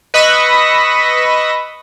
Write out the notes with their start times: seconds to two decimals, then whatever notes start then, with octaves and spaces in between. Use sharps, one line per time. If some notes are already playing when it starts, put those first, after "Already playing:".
0.14 B4 D#5 B5 C#6 E6 A#6